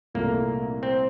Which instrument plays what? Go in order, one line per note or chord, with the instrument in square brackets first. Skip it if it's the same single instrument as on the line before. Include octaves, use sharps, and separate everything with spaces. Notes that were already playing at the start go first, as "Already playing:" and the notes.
[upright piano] C2 A#2 A3 [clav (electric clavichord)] A#3
[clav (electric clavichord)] C4